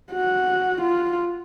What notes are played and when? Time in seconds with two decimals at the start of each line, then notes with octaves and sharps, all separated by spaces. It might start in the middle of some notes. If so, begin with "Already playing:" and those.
0.12 F#4
0.81 F4